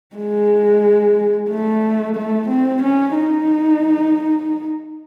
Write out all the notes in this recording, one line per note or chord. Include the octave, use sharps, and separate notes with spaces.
G#3
A3
A3
C4
C#4
D#4